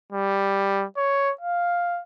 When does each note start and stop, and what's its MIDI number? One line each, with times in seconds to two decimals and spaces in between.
0.12 0.85 55
0.97 1.31 73
1.41 2.00 77